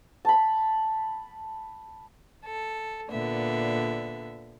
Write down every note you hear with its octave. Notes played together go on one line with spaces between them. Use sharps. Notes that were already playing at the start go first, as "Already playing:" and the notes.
A5 B5
A4
A#2 D3 B3 E5